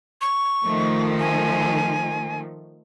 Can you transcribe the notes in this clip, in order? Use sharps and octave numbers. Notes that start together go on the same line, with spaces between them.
C#6
D#3 F3 A3
G#5